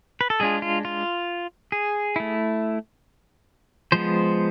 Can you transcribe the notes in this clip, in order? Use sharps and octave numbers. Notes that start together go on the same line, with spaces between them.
B4
A4
G#3 D4 F4 G#4
F4
F4
G#4
A3 E4
F3 G#3 B3 C5